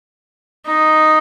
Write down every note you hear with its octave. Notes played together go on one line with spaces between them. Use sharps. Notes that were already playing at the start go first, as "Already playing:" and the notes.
D#4